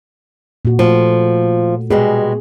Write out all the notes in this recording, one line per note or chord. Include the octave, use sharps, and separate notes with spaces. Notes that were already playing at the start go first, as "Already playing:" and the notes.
A#2 F#4
F3 A3
B2 G3 G#3 G#4